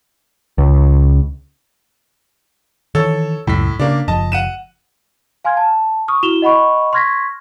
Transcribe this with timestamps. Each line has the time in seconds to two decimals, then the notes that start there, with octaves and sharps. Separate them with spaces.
0.58 C#2
2.95 D#3 E3 A4 C#5 E6
3.47 C#2 F#2 A2 B6
3.79 C#3 A#3 D4
4.08 F#1 F3 D#5 A5
4.32 F#5 D#7 E7
5.45 F5 G#5 C6 F6 G#6
5.57 A5
6.08 C#6 D#6 F6
6.23 E4 F#4 E7 F7 G7
6.42 D#5 F#5 B5 C#6
6.93 C6 C#6 F6 G#6 A#6 B6